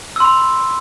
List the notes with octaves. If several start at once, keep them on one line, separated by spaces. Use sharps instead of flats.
B5 C6 E6